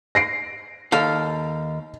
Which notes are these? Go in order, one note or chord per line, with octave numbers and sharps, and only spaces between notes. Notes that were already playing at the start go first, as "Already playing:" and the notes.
A#6 C7 D7
D#2 A4 F5